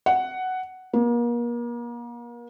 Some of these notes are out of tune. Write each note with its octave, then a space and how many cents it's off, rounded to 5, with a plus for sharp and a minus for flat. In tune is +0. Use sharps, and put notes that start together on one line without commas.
F#5 +5
A#3 +35